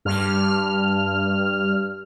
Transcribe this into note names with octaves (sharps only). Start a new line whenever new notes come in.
G2 F6